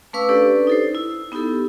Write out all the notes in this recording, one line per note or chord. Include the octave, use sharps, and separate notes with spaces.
A3 C#4 B4 F5 D6 E6
C#4 D4 G4 A4 B4 D5
D#4 A4 C5
E4
B3 D#4 E4 G4 A4